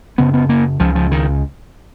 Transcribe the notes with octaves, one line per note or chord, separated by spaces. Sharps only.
F#2 C#3 B3
B3
A#3
C#2 C#3 F3
F3
D#3